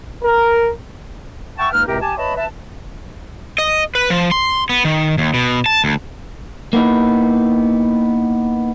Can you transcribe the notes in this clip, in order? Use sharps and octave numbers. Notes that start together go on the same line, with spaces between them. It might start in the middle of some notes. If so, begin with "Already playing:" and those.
A#4
E5 F#5 G5 A5 C#6
C#2 A#3 D#4 B4 F6
C#2 A2 C3 C4 G4 A#4
G4 G#5 A5
B4 C#5 D#5 E5 A5 B5
B4 E5 A5
D#5
B4
F3
C6
B3
D#3
D#2
B2
A5
D2
A#3 B3 D#4 E4